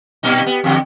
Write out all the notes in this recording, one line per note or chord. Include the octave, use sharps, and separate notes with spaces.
A#2 G3 D#4
B3
E2 D3 G4